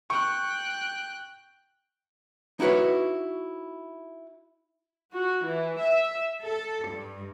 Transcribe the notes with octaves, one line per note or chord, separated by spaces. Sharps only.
G5 C#6 F#6
D#4 E4 F#4 B4 C#5
F#4
E3
E5
A4
G2